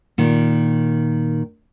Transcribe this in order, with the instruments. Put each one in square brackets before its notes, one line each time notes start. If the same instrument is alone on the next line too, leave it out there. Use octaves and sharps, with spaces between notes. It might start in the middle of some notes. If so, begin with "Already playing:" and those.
[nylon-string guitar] A#2 D#3